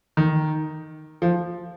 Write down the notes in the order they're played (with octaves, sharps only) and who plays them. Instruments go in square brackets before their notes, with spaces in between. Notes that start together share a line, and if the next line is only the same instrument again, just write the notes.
[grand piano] D#3
F3